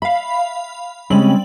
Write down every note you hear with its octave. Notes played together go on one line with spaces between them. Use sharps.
E5 F5 B5
C#3 G3 G#3 C4 C#4 F#7